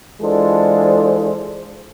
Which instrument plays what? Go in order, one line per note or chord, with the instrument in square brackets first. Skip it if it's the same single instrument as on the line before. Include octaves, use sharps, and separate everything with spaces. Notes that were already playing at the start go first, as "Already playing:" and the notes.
[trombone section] E3 G#3 D4 F4 A4 C5